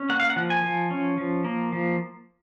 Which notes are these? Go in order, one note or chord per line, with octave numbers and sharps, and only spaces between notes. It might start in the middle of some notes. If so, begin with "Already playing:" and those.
Already playing: C#4
A#3 F#5
F5
F#5
F3
G#5
F3
C#4
F3
A#3
F3